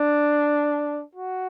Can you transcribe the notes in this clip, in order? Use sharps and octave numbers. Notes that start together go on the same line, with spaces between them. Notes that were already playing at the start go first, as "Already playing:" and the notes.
Already playing: D4
F#4